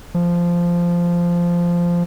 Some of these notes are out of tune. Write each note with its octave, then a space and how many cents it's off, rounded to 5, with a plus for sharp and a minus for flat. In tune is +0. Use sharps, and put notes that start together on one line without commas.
F3 -10